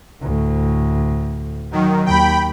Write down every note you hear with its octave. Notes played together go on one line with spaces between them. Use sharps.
D2 A2
D#3 F#3
D#2 G5 B5